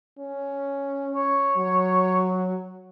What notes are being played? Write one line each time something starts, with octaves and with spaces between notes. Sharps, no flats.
C#4
C#5
F#3